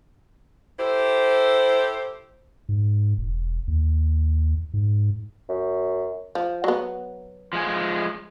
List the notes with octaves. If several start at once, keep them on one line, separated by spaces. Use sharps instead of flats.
E4 G4 A4 C5
G#2
E1
D#2
G#2
F#2
F3
F#3 B3
F3 G#3 G#5